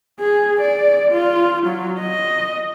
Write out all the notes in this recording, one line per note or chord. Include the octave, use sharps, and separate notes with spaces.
G#4
D5
F4
F#3
D#5